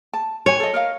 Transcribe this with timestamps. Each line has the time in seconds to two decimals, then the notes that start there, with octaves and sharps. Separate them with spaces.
0.13 A5
0.46 B4 C#5 G#5
0.60 A4 D#5
0.74 A#4 D#5 F5